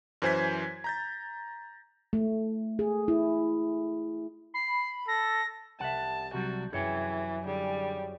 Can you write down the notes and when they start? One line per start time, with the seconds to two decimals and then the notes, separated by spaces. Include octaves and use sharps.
0.22 F#2 E3 C5 G#5 G#6 B6
0.84 A#5 G6 A6
2.13 A3
2.79 G#4
3.08 E4
4.54 B5 C7
5.08 A4 A#6
5.80 C2 E5 F#5 A5
6.34 C3 F#3 G3 F#4
6.73 F#2 E3 G#4 C#5 G5
7.46 D3 G3 G#4